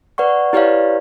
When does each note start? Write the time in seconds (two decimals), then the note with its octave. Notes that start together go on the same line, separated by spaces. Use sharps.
0.18 B4 D5 F#5 C#6
0.53 E4 G4 B4 C#5 D5 F5